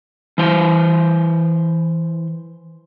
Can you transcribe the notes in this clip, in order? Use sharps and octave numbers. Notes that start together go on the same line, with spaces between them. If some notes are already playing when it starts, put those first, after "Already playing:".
E3 C5